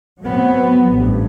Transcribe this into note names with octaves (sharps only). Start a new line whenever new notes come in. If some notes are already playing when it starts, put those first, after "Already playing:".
F#3 A3 B3 C4
A1 G2